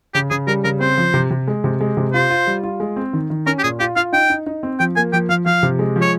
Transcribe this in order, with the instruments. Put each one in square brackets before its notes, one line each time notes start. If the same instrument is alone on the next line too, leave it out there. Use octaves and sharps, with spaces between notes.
[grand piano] C#3 [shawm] G4
[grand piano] C#3 [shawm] G#4
[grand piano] G3 [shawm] A#4
[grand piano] C#3 [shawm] A#4
[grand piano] C4 [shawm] C5
[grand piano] F3
C3
C3
G#3
C3
G#3
C3
[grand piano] F4 [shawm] C5
[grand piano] F4
G3
F4
G#3
C4
D#3
D#3
[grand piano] C#4 [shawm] A#4
[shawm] G4
[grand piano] A#2 [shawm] G#4
[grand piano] F4 [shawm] G4
[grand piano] F4 [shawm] F5
[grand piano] D#4 [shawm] G5
[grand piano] D#4
D#4
C4
[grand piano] F3 [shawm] G5
[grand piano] A#3 [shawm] G#5
[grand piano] F3 [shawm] G5
[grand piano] F3 [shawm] F5
[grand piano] F3 [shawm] F5
[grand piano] C3
G#3
F3
[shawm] C#5